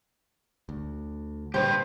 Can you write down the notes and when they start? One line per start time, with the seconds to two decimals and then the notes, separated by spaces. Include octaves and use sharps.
0.69 D2
1.54 A#2 D3 G3 G4 B4 C5